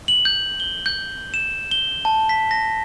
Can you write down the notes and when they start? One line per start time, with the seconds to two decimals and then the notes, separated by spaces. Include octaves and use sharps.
0.08 F#7
0.25 G6
0.60 G7
0.86 G6
1.34 E7
1.71 G7
2.05 A5
2.29 B6
2.51 A#6